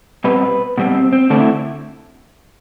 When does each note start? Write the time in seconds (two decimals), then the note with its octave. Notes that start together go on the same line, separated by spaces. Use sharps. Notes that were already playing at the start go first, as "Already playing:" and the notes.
0.24 B2 G3 C4 B4
0.78 B2 G3 C4
0.95 C4
1.13 C4
1.30 D3 A3 C4 D4
1.40 E4